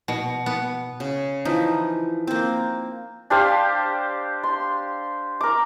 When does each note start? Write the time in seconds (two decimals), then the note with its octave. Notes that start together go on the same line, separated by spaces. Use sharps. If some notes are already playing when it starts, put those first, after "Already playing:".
0.08 B2
0.46 B3
1.00 C#3
1.45 E3 F3 D#4
2.27 A#3 C4
3.30 D4 G4 C5 F5
4.43 C6
5.41 A#4 D6